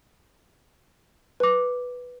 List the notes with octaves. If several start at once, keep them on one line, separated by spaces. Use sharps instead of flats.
B4 D6